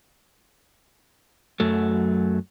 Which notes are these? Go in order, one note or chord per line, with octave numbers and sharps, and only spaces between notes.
F#2 F#3 A3